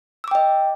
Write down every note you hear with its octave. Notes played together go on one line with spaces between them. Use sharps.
D#5 G5 D6 E6